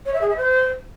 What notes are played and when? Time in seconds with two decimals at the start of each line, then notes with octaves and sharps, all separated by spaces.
0.06 C#5
0.13 E5
0.21 G#4
0.29 E5
0.37 C5